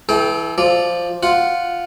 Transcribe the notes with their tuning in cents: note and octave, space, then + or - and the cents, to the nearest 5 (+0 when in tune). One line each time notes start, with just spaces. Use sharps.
E3 +0 A4 -45 G5 +5
F3 +0 D5 +0
F4 +0 F#5 +0